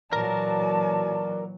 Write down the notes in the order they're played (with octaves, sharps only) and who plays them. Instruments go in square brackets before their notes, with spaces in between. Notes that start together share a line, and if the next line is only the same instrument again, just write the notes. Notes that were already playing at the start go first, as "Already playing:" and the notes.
[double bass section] A#2 E3 F#3 [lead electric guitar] A#4 A#5 [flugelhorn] D5 [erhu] A5